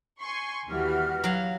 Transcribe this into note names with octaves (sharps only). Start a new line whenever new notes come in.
G#5 C6 C#6
D#2 E3 G3 F#4 F6
F#3 F5